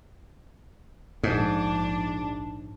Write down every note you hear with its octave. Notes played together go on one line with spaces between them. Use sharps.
A#1 G#2 D4